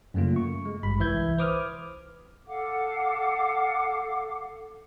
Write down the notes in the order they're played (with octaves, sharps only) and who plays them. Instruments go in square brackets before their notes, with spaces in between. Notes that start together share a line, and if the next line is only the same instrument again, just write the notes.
[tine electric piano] F#2 C#3 A3 A#3 F4
C#6
G#3
G#1 G2 G#3 B5
C2 E3 E5 G6 G#6
B4 C5 D6 D#6 F6
[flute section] A4 F5 F#5 D6